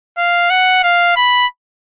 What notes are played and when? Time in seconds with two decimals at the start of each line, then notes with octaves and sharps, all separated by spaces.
0.18 F5
0.50 F#5
0.84 F5
1.16 B5